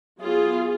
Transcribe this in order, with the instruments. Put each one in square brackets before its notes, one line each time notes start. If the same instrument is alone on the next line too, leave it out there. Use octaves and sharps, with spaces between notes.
[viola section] F#3 B3 F4 G#4